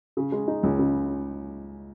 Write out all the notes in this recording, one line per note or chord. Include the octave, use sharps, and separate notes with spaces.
C#3
G#3
D#4
C#2
C#3